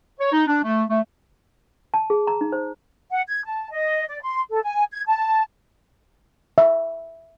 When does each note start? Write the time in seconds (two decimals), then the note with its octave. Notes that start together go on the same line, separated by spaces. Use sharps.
0.20 C#5
0.32 D#4
0.47 D4
0.63 A3
0.89 A3
1.94 A5
2.10 G#4
2.27 A#5
2.41 D#4
2.52 C5
3.10 F#5
3.28 G#6
3.45 A5
3.71 D#5
4.07 D5
4.22 C6
4.50 A4
4.63 G#5
4.92 G#6
5.07 A5
6.58 E5